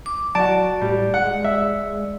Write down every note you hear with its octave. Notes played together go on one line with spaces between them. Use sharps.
D6
F#3 F#4 D5 A5
A2 G3
G#3 F#5
E5